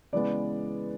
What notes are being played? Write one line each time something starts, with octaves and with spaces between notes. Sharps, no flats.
C#3 E3 G#3 B3 D5